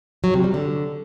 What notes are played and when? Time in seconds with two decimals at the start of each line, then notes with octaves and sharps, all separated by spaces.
0.24 F#3
0.34 C3
0.44 G3
0.54 D3